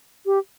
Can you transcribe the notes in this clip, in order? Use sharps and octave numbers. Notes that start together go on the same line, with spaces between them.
G4